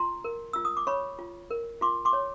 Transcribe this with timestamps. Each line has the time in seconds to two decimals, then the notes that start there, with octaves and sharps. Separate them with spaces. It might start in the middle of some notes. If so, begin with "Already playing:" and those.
Already playing: F4 A#5 C6
0.24 A#4
0.53 F4 E6
0.65 D#6
0.77 D6
0.87 C#5 B5 C#6
1.19 F4
1.51 A#4
1.81 F4 C6 D6
2.05 C6 D6
2.13 C#5